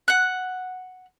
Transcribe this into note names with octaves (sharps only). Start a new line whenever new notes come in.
F#5 F#6